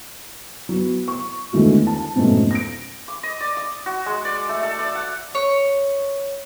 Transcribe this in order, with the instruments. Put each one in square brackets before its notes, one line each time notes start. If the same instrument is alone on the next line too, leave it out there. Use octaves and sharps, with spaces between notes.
[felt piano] F#3 B3
C#6
E2 D3 D#3 G#3 A3 F#4
A5
F2 G#2 B2 F#3 A3 C#4
A#6 D7
[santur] D6
D#5
D5
D#6
F#4
G#3
D5
A3
A4
D5
F#5
[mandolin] C#5